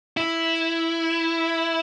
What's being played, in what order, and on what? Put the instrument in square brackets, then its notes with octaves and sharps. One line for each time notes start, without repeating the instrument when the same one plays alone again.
[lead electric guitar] E4